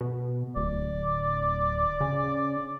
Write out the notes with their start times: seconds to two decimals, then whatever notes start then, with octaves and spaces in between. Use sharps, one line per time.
0.01 B2
0.56 D1 D5
2.01 C#3